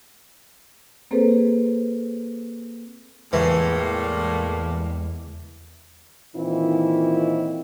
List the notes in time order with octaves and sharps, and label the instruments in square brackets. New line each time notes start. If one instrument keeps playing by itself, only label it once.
[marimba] A#3 C4 G#4 A4 B4 C5
[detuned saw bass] E2 [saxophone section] A2 G3 A#3 [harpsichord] E3 [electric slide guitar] G#3
[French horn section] A#2 D#3 E3 C4 E4 F4